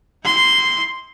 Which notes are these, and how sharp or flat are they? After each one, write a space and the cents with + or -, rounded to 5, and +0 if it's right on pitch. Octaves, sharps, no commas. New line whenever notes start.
E4 -45 C6 -5